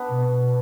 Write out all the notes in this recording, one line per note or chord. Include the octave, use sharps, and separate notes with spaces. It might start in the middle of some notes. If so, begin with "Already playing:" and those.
Already playing: B3 D4
B2